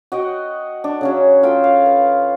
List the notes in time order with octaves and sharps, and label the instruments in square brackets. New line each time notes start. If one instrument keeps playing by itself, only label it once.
[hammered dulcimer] F#4 D#5 F#5 G5
D4
C#3 F#3 C#4
F4 A4 E5 G5
F5
B4